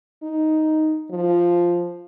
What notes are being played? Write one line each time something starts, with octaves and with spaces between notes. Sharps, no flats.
D#4
F3